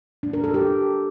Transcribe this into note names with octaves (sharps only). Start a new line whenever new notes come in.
D4
A#4
A4
G4